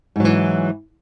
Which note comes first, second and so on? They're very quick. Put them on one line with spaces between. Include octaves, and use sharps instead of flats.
G#2 F#3 E3